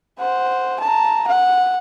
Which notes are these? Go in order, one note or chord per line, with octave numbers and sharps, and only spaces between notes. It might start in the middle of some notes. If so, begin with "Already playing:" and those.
C5 F#5
A5 A#5
F#5